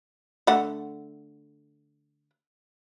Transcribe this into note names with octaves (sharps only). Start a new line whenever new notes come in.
D3 A3 F#5